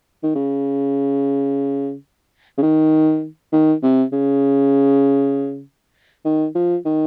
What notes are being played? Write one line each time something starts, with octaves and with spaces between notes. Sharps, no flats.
D#3
C#3
C#3
D#3
D#3
C3
C#3
D#3
F3
D#3